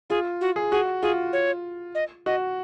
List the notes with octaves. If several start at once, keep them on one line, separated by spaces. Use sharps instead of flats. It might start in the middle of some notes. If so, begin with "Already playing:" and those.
F4 G#4
F#4
G#4
F#4 G#4
F4 G#4
C#5
D#5
F#4 D#5